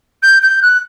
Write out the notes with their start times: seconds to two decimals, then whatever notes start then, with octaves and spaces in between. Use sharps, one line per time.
0.23 G6
0.42 G6
0.62 F#6